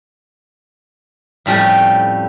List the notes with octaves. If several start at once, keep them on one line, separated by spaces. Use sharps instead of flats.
F2 A2 G3 C#4